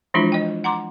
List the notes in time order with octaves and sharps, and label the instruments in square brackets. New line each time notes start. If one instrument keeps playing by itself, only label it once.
[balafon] E3 F3 G#3 D4 E4 F4
D#5 G5
F#5 A#5 C6 D6